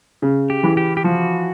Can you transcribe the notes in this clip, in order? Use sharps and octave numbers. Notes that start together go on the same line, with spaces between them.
C#3
G4
E3
G4
G4
F3 F#4